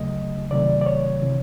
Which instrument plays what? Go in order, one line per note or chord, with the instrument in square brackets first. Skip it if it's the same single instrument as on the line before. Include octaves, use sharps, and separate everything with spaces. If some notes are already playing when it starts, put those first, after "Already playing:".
Already playing: [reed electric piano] D2 C#3 F#3 A3 D#5
C#2 C3 D#3 F#3 A3 D5
D5
C#5
C3 E3